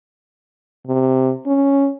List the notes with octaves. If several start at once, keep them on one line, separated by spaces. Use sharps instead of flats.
C3
C#4